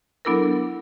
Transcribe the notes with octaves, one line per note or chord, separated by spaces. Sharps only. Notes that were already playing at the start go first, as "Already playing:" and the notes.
F#3 B3 D4 E4 A4 A#4